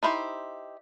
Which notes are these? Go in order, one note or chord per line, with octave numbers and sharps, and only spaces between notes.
D#4 E4 G4 C5